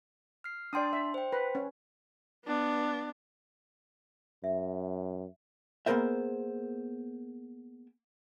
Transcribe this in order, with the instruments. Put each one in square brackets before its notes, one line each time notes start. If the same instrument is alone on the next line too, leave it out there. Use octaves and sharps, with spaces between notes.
[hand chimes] F6 C7
[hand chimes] D4 A5 C6 [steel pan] D5 G5 D#6
[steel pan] E5
[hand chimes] C5 G5
[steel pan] B4
C#4
[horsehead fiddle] B3 D4
[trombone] F#2 [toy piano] E5
[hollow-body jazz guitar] A#3 B3 G#4 A#4 C5 E5